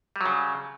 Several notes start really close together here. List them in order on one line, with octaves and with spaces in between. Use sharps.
G3 F#3 C#3